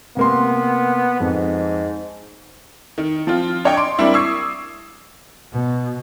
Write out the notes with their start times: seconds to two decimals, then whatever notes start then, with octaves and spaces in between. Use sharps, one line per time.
0.17 C3 A#3 B3 C6
1.20 F2 G#2
2.98 D#3
3.27 F3 C4 F4
3.65 D4 C#5 D#5 G5
3.77 C6 D6 D7
3.99 G3 A#3 C4 D4 E4
4.14 C#6 D#6 E6 G#6 C7
5.53 B2